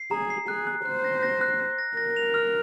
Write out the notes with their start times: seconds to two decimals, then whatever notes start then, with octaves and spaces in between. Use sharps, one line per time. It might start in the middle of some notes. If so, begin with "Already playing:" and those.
Already playing: C7
0.11 G#4 A#5
0.30 C7
0.48 G#4 F#6
0.67 F#6
0.85 C5 F#6
1.04 A#6
1.23 A#6
1.41 F#6
1.60 F#6
1.79 A#6
1.97 A#4 A#6
2.16 F7
2.34 F6